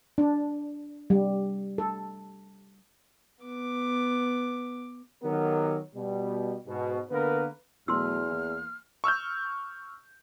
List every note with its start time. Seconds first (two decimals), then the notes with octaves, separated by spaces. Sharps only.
0.18 D4
1.10 G3
1.78 A4
3.43 B3 D6
5.23 D#3 F#3 B3 G4 A#4
5.95 B2 G3
6.67 G#2 B2
7.10 D3 A#3 B3 A#4 B4
7.88 E2 B2 F#3 A3 C6 E6 F6
8.29 E3 A#3
9.04 C#6 E6 F6 G6